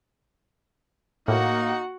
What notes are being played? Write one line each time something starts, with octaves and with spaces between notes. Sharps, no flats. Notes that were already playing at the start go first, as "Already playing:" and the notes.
A2 A#3 D#4 F#4 F#5